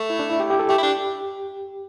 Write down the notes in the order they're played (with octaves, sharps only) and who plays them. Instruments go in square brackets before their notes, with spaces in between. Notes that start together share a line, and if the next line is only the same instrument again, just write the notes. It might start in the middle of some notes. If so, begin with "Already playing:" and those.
Already playing: [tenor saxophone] A3
[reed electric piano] E4
D4
E4
G4
G4
A4
[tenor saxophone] A3 [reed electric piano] G4
[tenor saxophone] E4
D4